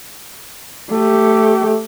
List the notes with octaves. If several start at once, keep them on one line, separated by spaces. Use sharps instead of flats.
A3 G4